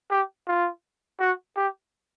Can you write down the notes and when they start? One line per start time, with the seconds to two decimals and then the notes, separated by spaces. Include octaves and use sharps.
0.11 G4
0.47 F4
1.20 F#4
1.57 G4